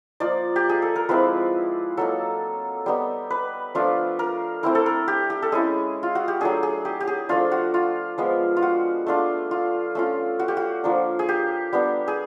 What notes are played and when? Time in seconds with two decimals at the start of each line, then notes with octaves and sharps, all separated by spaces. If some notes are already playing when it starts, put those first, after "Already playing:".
0.20 F3 A#3 D#4 D5
0.56 G4
0.69 G#4
0.82 A4
0.96 A#4
1.09 F3 G#3 C4 E4 B4
1.97 F#3 A#3 D#4 A4
2.86 G3 B3 D#4
3.31 B4
3.75 F3 A3 D4 F4
4.19 A#4
4.63 A3 C4 E4 A#4
4.75 A4
4.86 A#4
5.08 G4
5.30 G4
5.42 A4
5.52 G#3 C#4 E4 G#4
6.03 F4
6.15 F#4
6.28 G4
6.41 F#3 A3 D4 G#4
6.63 G#4
6.85 G4
7.00 G4
7.07 G#4
7.29 F3 A3 D4 F4
7.52 F#4
7.74 F4
8.18 F3 G#3 B3
8.57 F4
8.62 F#4
9.06 A3 D4 F4
9.51 F4
9.95 A3 C#4 F4
10.39 F#4
10.48 G4
10.57 F#4
10.84 F3 A#3 D4
11.19 G#4
11.29 G4
11.73 G3 B3 D4
12.08 G#4